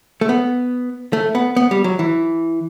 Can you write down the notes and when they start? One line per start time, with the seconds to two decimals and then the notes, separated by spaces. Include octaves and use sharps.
0.21 A3
0.29 B3
1.13 A3
1.35 B3
1.56 B3
1.71 G3
1.84 F#3
1.99 E3